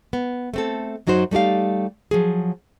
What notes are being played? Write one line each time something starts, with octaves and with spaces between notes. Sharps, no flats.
B3
A3 C4 A4
F#2 F#3 D#4 F#4 C5
G3 A3 D#4 G4 F5
F3 F#3 G#4